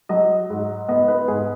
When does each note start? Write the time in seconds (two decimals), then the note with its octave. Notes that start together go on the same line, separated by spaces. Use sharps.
0.09 F#3 D#5
0.50 G#2
0.89 B3 D#5
1.08 B4
1.28 G#2 G#4